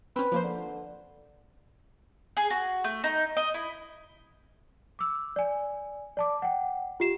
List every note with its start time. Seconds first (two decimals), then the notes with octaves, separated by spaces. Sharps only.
0.16 C4 C#4 B4
0.32 F3 A#3 C5
0.44 D3
2.37 G#4
2.50 F#4
2.84 A3
3.04 D#4
3.37 D#5
3.54 E4
4.99 D6 E6
5.36 D5 G#5
6.17 D5 A5 D6
6.42 F#5 G5
7.00 F4 G4 C7 E7